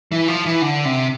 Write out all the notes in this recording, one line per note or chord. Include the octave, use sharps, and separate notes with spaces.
E3
F3
E3
D3
C3